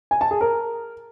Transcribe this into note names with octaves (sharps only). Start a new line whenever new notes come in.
G#5
A5
G#4
A#4